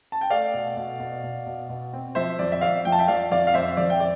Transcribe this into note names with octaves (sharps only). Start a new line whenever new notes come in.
A5
G5
A3 D5 F5
B2
B2
B2
B2
B2
B2
C4
F3 C5 E5
F2 D5
E5
F2 D5 F5
F3 G5
A5
E5 G5
F3 D5 F5
F2 D5 F5
F5
F2 C5 E5
F2 D5
G5
D5